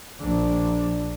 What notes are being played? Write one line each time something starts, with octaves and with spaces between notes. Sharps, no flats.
A#1 D4